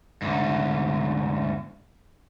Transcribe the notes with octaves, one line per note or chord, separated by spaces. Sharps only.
D2 G#2